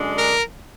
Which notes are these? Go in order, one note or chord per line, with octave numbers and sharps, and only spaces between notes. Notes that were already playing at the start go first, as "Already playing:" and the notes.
Already playing: F#2 D3 G#3 D4
A#4